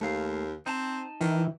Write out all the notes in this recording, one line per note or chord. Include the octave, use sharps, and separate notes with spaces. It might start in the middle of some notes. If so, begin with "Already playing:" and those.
D#2 A3 F5
C4 D#4 A5
D#3 E3